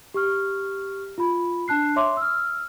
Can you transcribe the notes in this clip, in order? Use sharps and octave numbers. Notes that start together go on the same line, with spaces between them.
G4 C#6 F6
F4 B5
D4 A5 F#6 C7
C#5 E5 C6 D6
E6 F6